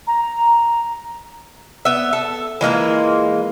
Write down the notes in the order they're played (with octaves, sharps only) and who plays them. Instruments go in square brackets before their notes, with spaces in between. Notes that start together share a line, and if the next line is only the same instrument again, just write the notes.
[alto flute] A#5
[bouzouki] B3 E5
A4
E3 G#3 A#3 F4